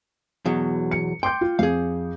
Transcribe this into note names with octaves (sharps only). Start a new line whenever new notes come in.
E2 B2 F#3
C#7
G5 C6 D6 G6
F4
F2 G#4 F5